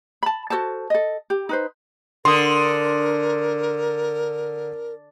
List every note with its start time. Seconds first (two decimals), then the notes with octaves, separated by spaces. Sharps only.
0.23 A5 B5
0.50 F#4 A4 C5 A5
0.90 A4 D#5
1.30 G4
1.49 D#4 B4 C5
2.25 D3 A#4 C6 D#6